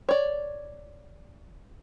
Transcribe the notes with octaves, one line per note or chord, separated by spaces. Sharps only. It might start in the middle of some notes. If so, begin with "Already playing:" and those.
C#5 D5